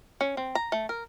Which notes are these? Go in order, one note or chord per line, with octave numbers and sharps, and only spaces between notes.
C#4
C4
A#5
A3
A#4